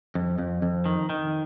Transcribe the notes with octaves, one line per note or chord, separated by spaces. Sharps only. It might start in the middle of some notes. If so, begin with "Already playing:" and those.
F2
F2
F2
D#3
D#3